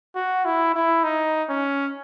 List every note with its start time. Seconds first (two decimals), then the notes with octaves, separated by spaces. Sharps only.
0.15 F#4
0.45 E4
0.74 E4
1.03 D#4
1.49 C#4